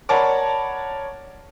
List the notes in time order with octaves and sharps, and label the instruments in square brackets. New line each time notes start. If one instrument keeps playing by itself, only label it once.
[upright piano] A#4 C#5 D5 F#5 A5 B5